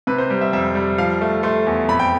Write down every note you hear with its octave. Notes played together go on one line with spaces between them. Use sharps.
C3 B4
C5
G3
E5
F2 E5
G3
F3 F5
A3
A3 C6
E2
F2 B5
G5